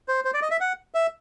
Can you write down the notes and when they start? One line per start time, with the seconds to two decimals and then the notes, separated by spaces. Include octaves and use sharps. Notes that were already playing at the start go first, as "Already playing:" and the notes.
0.08 C5
0.25 C5
0.34 D5
0.42 D#5
0.51 E5
0.60 F#5
0.94 E5